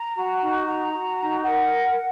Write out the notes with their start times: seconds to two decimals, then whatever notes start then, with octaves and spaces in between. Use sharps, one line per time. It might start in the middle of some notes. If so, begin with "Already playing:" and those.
Already playing: A#5
0.15 F#4
0.40 D#4
0.66 F#4 A#5
0.92 F#4
1.18 D#4
1.44 A#4 F#5